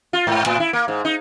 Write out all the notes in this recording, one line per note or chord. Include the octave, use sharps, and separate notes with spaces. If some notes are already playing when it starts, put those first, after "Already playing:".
F4
G#2
A2
E4
A#3
G#2
D#4